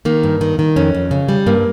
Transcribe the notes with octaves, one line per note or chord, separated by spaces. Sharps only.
D#3 A#3
G2
D#3
D#3
F2 C#4
F2
C#3
G3
G2 A#3